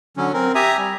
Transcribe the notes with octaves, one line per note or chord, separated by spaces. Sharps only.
D3 F#3 C#4
C4 A#4
G4 E5 G#5 A#5 D#6
G3